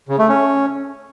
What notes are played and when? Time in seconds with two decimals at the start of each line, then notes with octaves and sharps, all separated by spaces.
0.09 C#3
0.19 A3
0.29 C#4